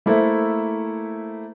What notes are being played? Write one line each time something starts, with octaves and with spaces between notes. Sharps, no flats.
A3 A#3 E4 A4 C5 E5